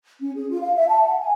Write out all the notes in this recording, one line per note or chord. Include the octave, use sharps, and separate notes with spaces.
C#4
G#4
F4
F5
E5
A5
F#5
G#5